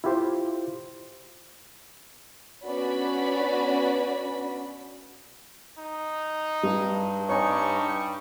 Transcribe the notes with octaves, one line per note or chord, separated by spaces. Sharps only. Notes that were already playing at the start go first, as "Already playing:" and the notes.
E4 F4 G4 C5
B3 C#4 D4 F#4 D5 B5
D#4
G2 G3
G3 D#4 C#5 G#5 C#6